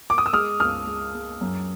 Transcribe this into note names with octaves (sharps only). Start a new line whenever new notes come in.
D6
D#6
E6
G#3 D#6 F6
C#2 D#6 F6
G#3
G#3
F#2